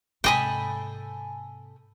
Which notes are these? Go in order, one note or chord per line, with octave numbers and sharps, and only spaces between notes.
G#2 C3 A4 D#5 G5 G#5 B5